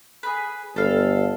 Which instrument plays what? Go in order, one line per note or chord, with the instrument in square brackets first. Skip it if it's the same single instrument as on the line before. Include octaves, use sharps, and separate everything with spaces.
[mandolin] G#4 B4
[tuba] G1 [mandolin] A4 F5